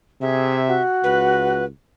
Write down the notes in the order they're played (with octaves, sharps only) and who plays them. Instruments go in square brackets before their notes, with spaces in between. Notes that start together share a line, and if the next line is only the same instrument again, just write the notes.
[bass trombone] C3 [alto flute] G#4 [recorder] E5
[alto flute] F#4
[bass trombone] C#2 [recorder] B4